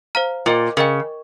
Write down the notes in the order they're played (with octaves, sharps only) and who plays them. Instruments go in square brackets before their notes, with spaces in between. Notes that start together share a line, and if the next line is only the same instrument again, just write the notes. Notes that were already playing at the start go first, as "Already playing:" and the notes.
[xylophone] C5 F5 A#5 F6
[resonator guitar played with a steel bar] A#2 [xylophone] A#4 D#5 G5
[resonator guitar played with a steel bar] C#3 [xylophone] A#4 D#5 G5